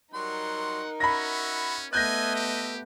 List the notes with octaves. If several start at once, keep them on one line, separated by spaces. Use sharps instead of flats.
F#3 G3 D#4 A#4 F#5 C6
C#4 F#4 E5 B5 A#6
A3 B3 D#5 E5 G#5 F#6 G6 A#6
G4